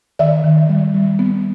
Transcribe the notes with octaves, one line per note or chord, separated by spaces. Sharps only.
D#3 D5 E5
D#3
G3
G3
B3